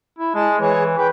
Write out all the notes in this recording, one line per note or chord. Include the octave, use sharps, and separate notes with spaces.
E4
G#3 G#4 A5
E3 G#4 C#5
B4 G5